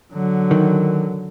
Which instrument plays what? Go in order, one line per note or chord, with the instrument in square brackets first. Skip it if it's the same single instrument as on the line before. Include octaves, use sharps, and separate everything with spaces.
[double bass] D3 F#3
[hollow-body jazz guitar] D#3